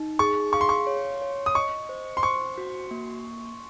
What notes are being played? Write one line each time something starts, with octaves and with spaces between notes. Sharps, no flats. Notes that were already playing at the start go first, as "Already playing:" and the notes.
Already playing: D#4
G#4 C#6
F5 C#6
C6
C#6
C#5
C#5
D#6
D#5 C#6
C5
C6
C5 C#6
F#4
A#3